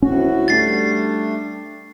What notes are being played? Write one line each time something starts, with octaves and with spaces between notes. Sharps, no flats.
D2 A2 C#4 F#4
G3 A3 D4 A6 C7